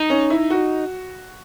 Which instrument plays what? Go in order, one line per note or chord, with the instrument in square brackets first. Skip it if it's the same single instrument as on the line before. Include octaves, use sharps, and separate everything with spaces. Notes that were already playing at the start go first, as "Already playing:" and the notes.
Already playing: [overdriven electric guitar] D#4
[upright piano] C#4
E4
F#4